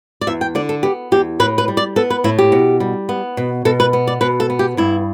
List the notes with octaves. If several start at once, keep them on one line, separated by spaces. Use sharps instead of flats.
D5
E2 E5
G5
D3 D5
A4
B3 G4
E2 G4
A2 B4
B4
G3
D5
B3 A4
B4
A2 E4
G4
B2
G3
B3
B2
B2 A4
B4
B3
D5
B2 B4
A4
B3
G4
G2 E4